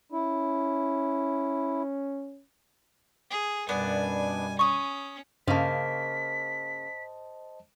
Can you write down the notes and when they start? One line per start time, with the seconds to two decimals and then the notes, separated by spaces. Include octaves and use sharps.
0.12 C#4 E4
3.30 G#4
3.69 F#2 B2 G3 B3 D4 G#5
4.59 C#4 C#6 D#6
5.48 G2 C#3 A#3 C5 D#5 A5 B6